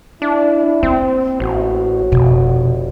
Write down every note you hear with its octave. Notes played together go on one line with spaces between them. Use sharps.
D4 E4
A#3 C4
A1 F#4
F1 B2